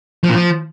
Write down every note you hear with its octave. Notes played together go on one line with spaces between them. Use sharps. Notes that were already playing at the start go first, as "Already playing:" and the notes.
F3
A#2
F3